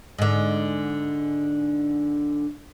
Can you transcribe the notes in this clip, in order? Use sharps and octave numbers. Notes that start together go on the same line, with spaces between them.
G#2 D3